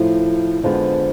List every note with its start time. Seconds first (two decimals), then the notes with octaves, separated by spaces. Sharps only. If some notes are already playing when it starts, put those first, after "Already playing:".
Already playing: A2 F3 A3
0.63 F2 D3 F3 G#3 B3